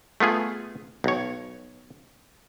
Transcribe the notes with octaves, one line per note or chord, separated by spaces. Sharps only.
A3 B3 F4 G#4
B1 C#5